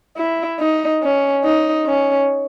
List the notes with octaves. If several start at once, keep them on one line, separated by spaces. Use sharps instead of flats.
E4
D#4
C#4
D#4
C#4